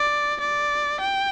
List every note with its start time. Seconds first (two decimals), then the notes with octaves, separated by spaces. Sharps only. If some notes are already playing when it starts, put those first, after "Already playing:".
Already playing: D5
0.41 D5
1.00 G5